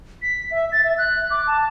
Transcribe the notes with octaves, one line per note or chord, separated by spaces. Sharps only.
B6
E5
A6
E5
F#6
D6
A5